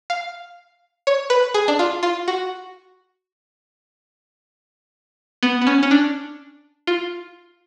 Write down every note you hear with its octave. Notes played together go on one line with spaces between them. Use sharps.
F5
C#5
B4
G#4
D4
F4
F4
F#4
B3
B3
C#4
C#4
D4
F4